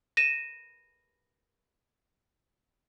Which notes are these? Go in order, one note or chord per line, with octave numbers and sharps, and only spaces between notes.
A#6 D#7 E7